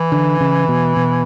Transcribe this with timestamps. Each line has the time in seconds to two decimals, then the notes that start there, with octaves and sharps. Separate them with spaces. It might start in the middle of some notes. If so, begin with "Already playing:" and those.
Already playing: E3
0.12 D3
0.40 C#3
0.68 B2
0.96 B2